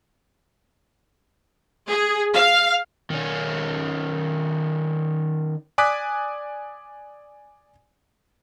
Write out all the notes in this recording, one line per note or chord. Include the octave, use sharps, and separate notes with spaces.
G#4
F5
D#3 C#4
D5 G#5 D6 D#6 F#6 B6